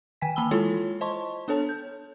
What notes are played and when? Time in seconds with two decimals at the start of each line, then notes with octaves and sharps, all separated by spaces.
0.21 D#3 G5 G#5 B6
0.36 E3 A#3 A5 B5 E6 G7
0.51 G#3 E4 F4 A4 C#5
1.01 C5 D#5 A5 C6 C#6
1.48 B3 D4 A4 C#5 A5
1.69 G6